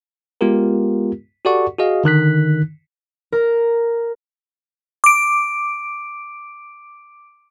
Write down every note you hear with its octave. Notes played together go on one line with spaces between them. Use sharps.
G#3 B3 F4 G4 A#4
F#4 G4 A4 D5 F#5 C#6
F#4 G#4 D#5 F5
D3 D#3 F#6 B6
A#4
D6 D7